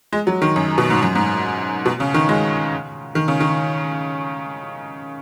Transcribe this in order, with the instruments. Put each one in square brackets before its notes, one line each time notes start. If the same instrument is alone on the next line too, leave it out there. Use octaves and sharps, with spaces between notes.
[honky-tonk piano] G#3
F#3
D#3
F#2
B2
G#2
F#2
G#2
B2
C#3
D#3
G#3
D#3
C#3
D#3